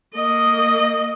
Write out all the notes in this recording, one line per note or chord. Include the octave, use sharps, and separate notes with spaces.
A#3 D#5